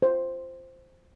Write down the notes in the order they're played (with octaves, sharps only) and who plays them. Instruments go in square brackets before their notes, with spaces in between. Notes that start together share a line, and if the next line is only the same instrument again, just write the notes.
[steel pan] C5